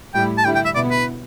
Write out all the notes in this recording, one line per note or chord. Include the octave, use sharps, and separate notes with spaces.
A2 G3 E4 G5
A5
D3 G3 E4 G5
G5
E5
B2 B3 E4 D5
B4